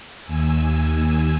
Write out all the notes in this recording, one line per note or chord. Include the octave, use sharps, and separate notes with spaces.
D#2 G#5 E6